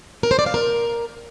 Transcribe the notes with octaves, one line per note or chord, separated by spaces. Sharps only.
A#4
C5
D5
F5
A#4